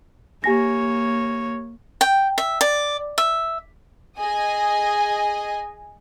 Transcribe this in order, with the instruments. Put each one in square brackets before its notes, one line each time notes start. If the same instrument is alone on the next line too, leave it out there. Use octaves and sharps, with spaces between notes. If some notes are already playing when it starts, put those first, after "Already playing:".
[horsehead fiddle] A#3 C#5 [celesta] G4 G#5 A#6
[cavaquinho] G5
E5
D5
E5
[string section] G#4 D#5 G#5